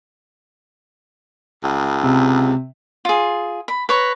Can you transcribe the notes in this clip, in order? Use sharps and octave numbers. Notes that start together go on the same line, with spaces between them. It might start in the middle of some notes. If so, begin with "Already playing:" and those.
C#2
C3
F4 G#4
B5
B4 C#5 A#5